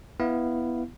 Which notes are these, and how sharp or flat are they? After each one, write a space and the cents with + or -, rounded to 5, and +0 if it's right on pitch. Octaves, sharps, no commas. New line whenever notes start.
B3 +0 E4 +0 F5 -10